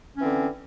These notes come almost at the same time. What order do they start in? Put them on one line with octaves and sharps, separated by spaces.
C#4 E3 C4 D3